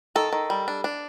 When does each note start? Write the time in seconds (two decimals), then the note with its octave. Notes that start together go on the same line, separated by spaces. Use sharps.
0.15 D#3 A4
0.32 D#3
0.50 G3
0.68 D4
0.84 D4